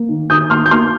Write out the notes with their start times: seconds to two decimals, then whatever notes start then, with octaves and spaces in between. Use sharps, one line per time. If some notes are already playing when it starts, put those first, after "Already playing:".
Already playing: A#3
0.09 D#3
0.30 D#3 D#6 G6
0.50 A#3 C6 F6
0.66 G6
0.71 A#3 C6 F6